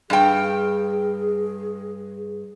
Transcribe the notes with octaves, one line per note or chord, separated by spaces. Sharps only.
G2 G#4 G5